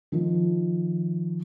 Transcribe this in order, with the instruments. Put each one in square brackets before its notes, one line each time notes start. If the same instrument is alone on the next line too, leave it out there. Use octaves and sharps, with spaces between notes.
[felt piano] D#3 F3